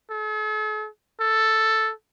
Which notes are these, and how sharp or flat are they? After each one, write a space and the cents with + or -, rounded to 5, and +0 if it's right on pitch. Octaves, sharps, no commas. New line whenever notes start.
A4 -45
A4 +5